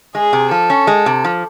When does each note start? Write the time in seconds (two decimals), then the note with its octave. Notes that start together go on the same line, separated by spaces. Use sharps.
0.15 G#3 G#4
0.33 C3
0.51 F3 A4
0.70 C#4
0.87 G#3
1.06 C3
1.25 F3